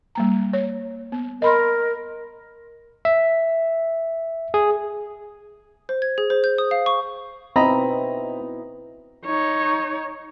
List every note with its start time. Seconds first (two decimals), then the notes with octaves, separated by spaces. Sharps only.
0.15 G3 A#3 A#5
0.53 C#5
1.12 B3
1.42 A#4 D#5 B5 C6
3.05 E5
4.54 G#4
5.89 C5
6.02 G#6
6.18 G#4
6.30 C5
6.44 G6
6.58 D#6
6.71 F5
6.86 C#6
7.56 B2 C4 D#4 E4 D#5 A#5 B5
9.26 D#4 C#5